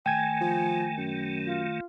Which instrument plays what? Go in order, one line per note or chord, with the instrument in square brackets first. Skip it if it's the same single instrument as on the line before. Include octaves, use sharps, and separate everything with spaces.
[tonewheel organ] D#3 A3 [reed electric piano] G5 G#6 [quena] G#5
[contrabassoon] F3
F#2
[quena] F4